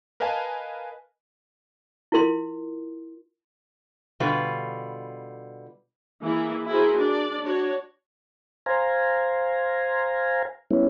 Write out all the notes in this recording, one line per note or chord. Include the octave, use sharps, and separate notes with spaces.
A#4 B4 D#5 F5 G#5 A5
E4 F4 A#4 C6
B2 D3 G3 F4 B4
E3 A#3 E4 G#4
E4 F#4 G#4 A#4 C5
D4 D5
D4 F#4 C#5
C5 F5 G#5 A#5
G3 B3 C#4 E4